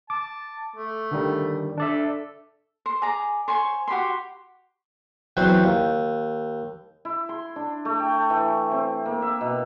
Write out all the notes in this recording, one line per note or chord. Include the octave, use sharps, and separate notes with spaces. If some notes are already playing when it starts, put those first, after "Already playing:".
A5 D6
A3
D3 D#3 G3
D4 A4 D5 E5
C5
G#4 D5 A#5
C5 C#5 G#5 C#6
F#4 G4 B5 C6
E2 F#3 C4 B5
D#2
E4
C6
D4
A3
G5
E3
C4
A#3
E5
B2